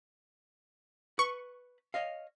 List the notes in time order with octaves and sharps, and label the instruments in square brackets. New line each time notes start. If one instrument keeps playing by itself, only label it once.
[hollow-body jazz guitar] B4 [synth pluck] C#6
[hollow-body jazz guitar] C#5 D#5 F5